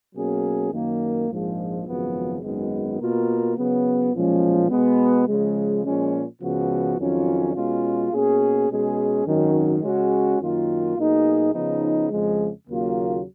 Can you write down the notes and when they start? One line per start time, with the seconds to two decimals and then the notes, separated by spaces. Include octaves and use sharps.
0.14 B2 F#3 A#3 C#4 G#4
0.71 F#2 D#3 A#3
1.28 A#1 G#2 F3 G#3
1.85 G#1 F#2 C#3 F3 B3
2.42 G#1 F#2 D#3 G#3 B3
2.98 B2 A#3 F4 A#4
3.56 C#3 F#3 B3
4.12 B1 A#2 F3 G#3 C#4
4.69 B2 G#3 B3
5.27 C#3 F3 G#3
5.83 A#2 F3 G#3 C#4
6.40 C#2 C#3 F3 B3 F#4
6.96 F2 D#3 F#3 C#4 F4
7.54 B2 G#3 C#4 F4
8.11 B2 A#3 C#4 G#4
8.68 B2 G#3 C#4 G#4
9.24 G#1 F#2 D#3 F#3 C#4
9.81 C#3 G#3 C#4 F#4
10.38 F#2 D#3 A#3 F4
10.96 B1 B2 A#3 D#4 G#4
11.53 C#3 F3 B3 D#4
12.09 F2 C#3 F3 G#3
12.66 D#2 C#3 F#3 A#3 F4